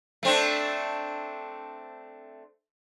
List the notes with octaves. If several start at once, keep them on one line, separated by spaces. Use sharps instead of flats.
A3 C4 D4